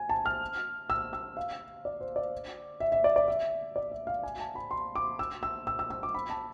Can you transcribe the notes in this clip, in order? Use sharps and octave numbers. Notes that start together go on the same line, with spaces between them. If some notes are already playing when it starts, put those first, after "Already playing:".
Already playing: G#5
A5
F6
E6
E6
F5
D5
C5
D5
E5
E5
D5
D5
E5
D5
E5
F5
G#5
A5
B5
C6
D6
E6
E6
E6
E6
E6
D6
B5
A5